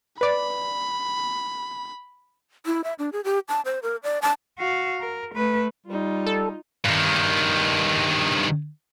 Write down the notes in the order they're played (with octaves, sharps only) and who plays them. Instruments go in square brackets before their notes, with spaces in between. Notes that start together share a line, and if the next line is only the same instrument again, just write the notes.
[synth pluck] B4 D5 [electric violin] B5
[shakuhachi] E4
E5
D4
G#4
G4
A5
C5
A#4
D5
A5
[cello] F#4 F5
A#4
A3 B4
[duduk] G3 [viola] D#4 F4
[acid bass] A4
[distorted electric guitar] G2 D#3